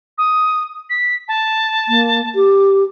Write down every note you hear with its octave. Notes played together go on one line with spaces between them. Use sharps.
D#6
B6
A5
A#3
G4